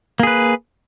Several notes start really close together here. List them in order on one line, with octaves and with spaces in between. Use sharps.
A#3 G#4 B4